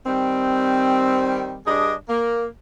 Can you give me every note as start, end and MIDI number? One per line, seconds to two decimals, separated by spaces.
0.07 1.60 51
0.07 1.60 55
0.07 1.60 60
1.67 1.93 43
1.67 1.93 62
1.67 1.93 68
1.67 1.93 75
2.09 2.47 58